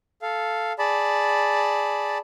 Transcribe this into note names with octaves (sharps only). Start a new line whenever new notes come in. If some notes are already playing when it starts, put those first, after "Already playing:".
A4 F5
G#4 D5 A5 B5